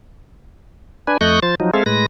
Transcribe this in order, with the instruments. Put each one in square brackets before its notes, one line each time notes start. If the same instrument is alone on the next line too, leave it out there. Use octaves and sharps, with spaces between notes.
[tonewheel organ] D4 B4 G#5
F2 A3 D#5 C#6 F#6 G6
F3 C5 A6
F3 F#3 D#4
G#3 C4 G#4 A4 E5 F5
A2 G#3 B4 A#6